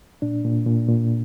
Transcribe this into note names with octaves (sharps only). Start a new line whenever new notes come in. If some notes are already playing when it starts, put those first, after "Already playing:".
A#2 D4
A#2
A#2
A#2